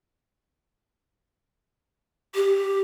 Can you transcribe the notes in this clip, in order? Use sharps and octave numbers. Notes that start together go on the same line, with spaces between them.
G4